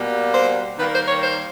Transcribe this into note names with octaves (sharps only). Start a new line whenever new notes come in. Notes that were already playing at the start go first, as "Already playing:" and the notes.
Already playing: B2 G3 A#3
C5
D#3 G3 A#3 B4
C5
C#5
C5